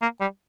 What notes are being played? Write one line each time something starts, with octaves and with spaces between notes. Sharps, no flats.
A#3
G3